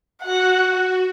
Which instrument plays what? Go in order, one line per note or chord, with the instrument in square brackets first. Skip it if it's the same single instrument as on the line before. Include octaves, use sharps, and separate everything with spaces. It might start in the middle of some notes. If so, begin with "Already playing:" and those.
[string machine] F#4 [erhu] F#5